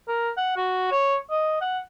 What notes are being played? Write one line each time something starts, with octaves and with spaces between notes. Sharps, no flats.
A#4
F#5
F#4
C#5
D#5
F#5